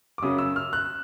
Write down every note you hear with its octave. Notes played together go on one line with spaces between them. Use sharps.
D6
F#2 C#3 F#3 D#6
E6
F6
F#6